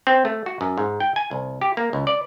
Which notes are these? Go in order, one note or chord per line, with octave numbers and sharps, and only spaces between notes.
C4
A3
F#4
F#2
G#2
G5
G#5
C2
G4
A#3
C#2
D5